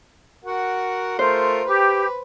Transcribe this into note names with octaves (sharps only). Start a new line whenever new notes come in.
F#4 A#4 F#5
A3 F4 A#4 C5
G4 B4